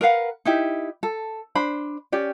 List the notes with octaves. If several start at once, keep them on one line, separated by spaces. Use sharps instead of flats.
A#4 B4 F5 F#5
D#4 E4 G4
A4
D4 C5 B5
C#4 G4 D5